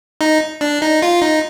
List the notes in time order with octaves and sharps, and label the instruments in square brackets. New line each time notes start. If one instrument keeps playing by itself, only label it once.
[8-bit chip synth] D#4
D4
D#4
F4
D#4